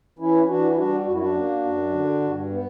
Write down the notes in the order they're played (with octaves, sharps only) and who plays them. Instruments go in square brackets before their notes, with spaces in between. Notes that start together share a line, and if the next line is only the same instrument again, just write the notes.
[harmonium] E3 C#4 E4
E3 D4 F#4
E4
G3 D4 F#4
F#2 F#4
E4
D4 F#4
A#3
F#2
D3
G2
B3